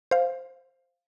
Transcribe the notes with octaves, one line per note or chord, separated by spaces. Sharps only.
C5 F5